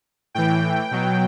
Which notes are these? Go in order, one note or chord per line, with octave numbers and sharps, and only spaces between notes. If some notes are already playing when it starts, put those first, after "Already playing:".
A2 E3 G5
B2 F#3